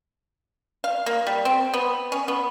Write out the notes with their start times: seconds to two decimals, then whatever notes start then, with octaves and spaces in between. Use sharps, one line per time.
0.84 F5
1.06 A#3
1.27 G3
1.45 C4
1.74 B3
2.12 C#4
2.28 B3